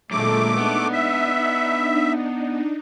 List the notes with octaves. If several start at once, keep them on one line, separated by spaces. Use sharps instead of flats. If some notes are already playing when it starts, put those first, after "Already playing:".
F#2 A#2 D3 G#3 A3 D6
B3 D4 D#4
E5